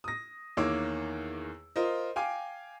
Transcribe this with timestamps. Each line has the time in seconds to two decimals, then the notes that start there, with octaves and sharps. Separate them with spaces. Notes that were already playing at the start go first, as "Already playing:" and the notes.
0.04 D#6 A#6
0.57 E2 D#3 A#3 C#5 D6 E6
1.76 F4 A#4 C5 D#5
2.16 F5 G5 G#5 D6